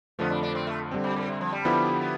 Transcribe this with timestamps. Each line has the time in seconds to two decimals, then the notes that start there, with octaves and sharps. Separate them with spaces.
0.19 F2 D3 F3 A3 B3
0.31 D4
0.43 D4
0.55 C4
0.67 A3
0.91 D3 G3 C4
1.04 B2
1.16 A2
1.28 C3
1.41 F3
1.52 G3
1.65 D3 F3 B3 E4 G4
2.01 B3